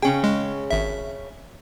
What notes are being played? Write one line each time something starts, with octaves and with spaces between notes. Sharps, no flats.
C#3 C#4 G#4 G5
G#3
G#1 E5